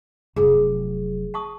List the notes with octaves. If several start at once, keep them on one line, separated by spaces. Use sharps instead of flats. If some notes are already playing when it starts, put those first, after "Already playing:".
F1 F#3 G#4
A5 C#6 D#6